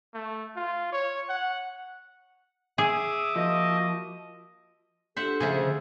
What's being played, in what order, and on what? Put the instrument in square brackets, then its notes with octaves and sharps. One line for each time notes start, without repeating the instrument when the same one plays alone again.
[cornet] A3
F4
C#5
F#5
[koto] G#4 [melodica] E5 D6 D#6
[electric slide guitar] F3 [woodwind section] A#3 F#4 D#5
[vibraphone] D4 F4 G4 [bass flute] A4 [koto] C5 E5 F#5
[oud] C#3 F3 A3 [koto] G#4 [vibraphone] E6
[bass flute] D3 [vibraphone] D#5 E6